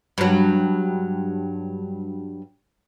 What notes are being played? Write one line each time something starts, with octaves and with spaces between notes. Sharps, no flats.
G2 F#3